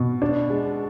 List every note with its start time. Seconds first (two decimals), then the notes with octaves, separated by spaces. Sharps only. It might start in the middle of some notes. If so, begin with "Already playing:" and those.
Already playing: B2
0.22 D4
0.50 G#3